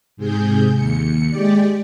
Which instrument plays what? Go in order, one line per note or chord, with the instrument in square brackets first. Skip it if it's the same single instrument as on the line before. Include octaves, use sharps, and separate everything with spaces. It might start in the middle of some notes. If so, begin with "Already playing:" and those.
[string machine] G#2 C3 G#4 G6
D#2 C#7
G#3 G4 D5